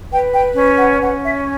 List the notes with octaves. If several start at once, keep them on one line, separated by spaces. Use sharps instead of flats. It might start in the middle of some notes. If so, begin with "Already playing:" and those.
B4 G5
G5
C#4
F#5
C#4 F#5
E5